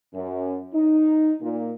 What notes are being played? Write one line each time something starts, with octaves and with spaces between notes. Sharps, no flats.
F#2
D#4
A#2